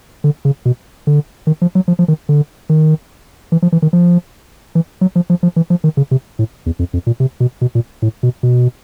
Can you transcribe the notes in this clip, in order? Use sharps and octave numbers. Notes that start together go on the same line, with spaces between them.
D3
C#3
B2
D3
D#3
F3
F#3
F3
F3
D#3
D3
D#3
E3
F3
E3
D#3
F3
E3
F#3
F3
F3
F3
E3
F3
D#3
C#3
C3
A2
E2
F2
F2
A#2
C3
B2
B2
A#2
A2
B2
B2